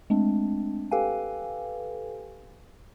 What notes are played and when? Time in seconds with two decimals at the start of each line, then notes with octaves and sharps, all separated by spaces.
0.10 G#3 A3 C4 D4
0.91 G4 A4 B4 F5 G5 G#5